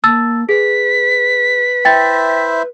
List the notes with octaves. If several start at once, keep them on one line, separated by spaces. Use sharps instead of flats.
A#3 A5 E6 A6
G#4 B4 B6
E4 C5 E5 G5 A6